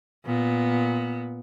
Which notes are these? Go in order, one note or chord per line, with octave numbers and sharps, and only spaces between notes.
A#2 B3